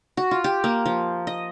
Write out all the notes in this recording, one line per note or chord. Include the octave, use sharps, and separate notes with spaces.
F#4
F4
G4
A#3
F3
D#5